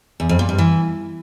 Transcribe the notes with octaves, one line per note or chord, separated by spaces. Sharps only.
E2
F2
A#2
G2
E3